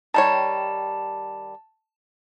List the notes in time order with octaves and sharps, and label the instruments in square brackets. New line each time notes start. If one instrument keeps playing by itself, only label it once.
[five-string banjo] D#3 G3 C#5 [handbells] A5